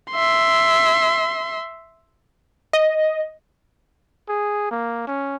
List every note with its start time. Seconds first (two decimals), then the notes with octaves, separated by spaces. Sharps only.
0.12 E5 C6
2.73 D#5
4.29 G#4
4.71 A#3
5.07 C#4